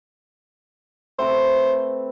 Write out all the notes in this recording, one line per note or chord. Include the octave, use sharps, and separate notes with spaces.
A3 C4 B4 C5